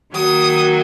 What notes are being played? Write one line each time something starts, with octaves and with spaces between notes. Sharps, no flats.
D#3 F#3 A#3 D#6